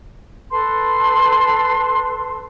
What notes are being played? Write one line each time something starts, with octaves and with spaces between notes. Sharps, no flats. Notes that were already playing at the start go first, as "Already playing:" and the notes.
A4 B4 A5 C6